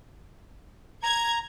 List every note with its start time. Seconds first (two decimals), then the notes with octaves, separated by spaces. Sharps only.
1.03 A#5 G#6